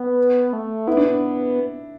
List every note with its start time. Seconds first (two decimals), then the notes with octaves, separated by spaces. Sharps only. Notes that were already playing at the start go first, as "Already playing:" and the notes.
Already playing: B3
0.53 A3
0.87 B3 E4
0.97 D4